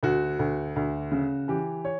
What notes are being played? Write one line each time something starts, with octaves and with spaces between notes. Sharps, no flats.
D2 F#4
D2
D2
C#3
E3 G4
C#5